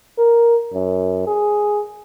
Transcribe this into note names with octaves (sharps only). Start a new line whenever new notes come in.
A#4
F#2
G#4